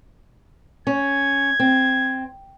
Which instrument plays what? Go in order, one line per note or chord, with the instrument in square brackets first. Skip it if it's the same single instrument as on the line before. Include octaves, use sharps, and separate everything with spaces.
[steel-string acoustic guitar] C#4 [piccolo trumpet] G#6
[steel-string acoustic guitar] C4